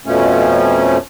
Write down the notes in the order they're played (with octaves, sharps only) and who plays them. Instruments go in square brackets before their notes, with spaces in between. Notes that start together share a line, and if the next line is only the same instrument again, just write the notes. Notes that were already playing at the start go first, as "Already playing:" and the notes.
[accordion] F2 B2 F3 A3 C#4